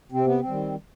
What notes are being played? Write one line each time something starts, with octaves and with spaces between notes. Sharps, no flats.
C3 C4
B3
C4
D#3 G3